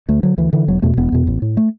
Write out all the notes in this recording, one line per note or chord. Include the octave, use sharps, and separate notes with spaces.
D2 A3
D3 F#3
D2 E3
D3 E3
E1 F#3
E2 B2 A3
E1 B3
E2 B2
A1
A2
A3